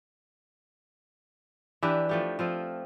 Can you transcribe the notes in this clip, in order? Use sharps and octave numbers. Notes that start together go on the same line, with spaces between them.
E3 D4 G4 B4
F3 A3 G4
F3 C4 F4